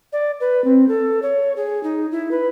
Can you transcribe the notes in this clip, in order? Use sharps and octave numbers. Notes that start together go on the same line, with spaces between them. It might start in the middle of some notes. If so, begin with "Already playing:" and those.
D5
B4
C4
A4
C#5
G#4
D#4
E4
B4